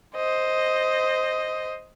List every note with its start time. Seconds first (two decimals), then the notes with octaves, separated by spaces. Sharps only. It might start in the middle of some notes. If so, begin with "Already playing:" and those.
0.16 C5 D#5